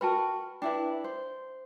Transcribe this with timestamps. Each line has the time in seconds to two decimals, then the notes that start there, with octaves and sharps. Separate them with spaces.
0.01 F#4 A#4 B4 G5 A5 B5
0.62 D4 E4 B4 G5
1.04 C5